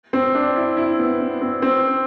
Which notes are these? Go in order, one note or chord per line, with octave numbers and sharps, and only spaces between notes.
C4
D4
E4
E4
B3
B3
C4
C4